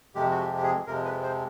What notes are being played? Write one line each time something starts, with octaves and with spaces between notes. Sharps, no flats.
F2 C3 F3 G#3 G4
F#4
G4
G4
G#4
F2 C3 F3 G#3 A#4
B4
C5